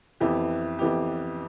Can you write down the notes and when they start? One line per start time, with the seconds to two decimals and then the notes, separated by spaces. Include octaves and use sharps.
0.20 F2 E3 B3 E4 G4
0.79 F2 E3 B3 E4 G4